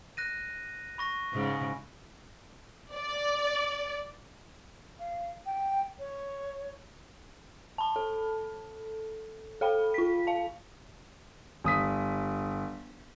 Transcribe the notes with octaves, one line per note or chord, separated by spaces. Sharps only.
F#6 A#6 D#7
B5 C#6 A#6
G#2 C#3
D5
F5
G5
C#5
A5 B5
A4
A4 F5 G5 B5
F4 B6
F5 A5
G1 D#6 B6